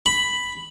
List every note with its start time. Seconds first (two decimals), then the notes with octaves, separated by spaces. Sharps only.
0.06 B5